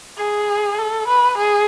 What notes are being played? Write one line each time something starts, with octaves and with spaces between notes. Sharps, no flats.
G#4
A4
B4
G#4